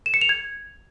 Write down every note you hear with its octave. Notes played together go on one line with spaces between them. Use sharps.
E7
C#7
F7
G#6